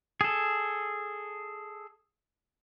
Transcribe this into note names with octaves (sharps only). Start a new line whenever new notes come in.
G#4 A4